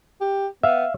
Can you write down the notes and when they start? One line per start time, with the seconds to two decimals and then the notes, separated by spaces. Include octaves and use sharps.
0.21 G4
0.63 B3 E5 F5